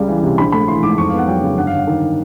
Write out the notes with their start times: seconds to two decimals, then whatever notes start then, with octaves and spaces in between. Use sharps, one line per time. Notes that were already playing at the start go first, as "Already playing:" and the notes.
Already playing: C#2 C#3 G3
0.08 E3
0.23 C3
0.38 A#1 B5
0.52 A3 B5
0.68 E3 C6
0.83 G#2 D6
0.98 F2 C#6
1.09 B3 F5
1.18 F#5
1.28 F#3 G5
1.43 C#3
1.57 G1 F#5
1.67 F5
1.73 G1 F#5
1.87 D#3